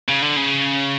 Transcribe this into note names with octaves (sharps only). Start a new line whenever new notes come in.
C#3
D3
C#3